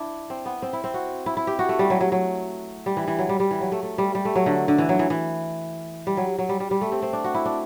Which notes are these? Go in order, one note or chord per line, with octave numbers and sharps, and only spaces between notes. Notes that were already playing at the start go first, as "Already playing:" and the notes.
Already playing: D4 E4
C4
B3
C4
E4
C4
F#4
E4
E4
G4
F#4
A3
G3
F#3
F#3
F#3
G3
E3
E3
F#3
G3
G3
E3
F#3
A3
A3
G3
G3
A3
F#3
D3
D3
E3
F#3
E3
E3
G3
F#3
F#3
G3
G3
G3
A3
C4
C4
D4
F#4
E4
D4